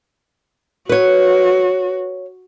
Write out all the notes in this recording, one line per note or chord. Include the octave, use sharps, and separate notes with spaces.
F#4 B4 C#5